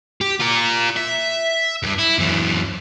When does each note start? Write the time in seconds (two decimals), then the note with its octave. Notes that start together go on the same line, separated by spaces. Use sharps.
0.21 G4
0.40 F4 A#4
0.96 E5
1.83 E2 G2
1.98 E4
2.18 F#2 E3